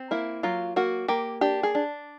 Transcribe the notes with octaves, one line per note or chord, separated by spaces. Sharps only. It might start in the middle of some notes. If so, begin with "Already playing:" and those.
Already playing: C4
A#3 E4
F#3 F4
A#3 F#4
A#3 G4
D4 G4
G#4
D4